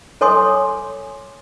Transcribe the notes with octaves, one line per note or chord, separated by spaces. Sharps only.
A4 C#5 G#5 C6 D6 D#6